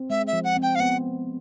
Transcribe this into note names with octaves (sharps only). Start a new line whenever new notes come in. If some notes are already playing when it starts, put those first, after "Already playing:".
Already playing: C4
G#3 E5
E5
F3
F#5
C4
G5
F5
B3 F#5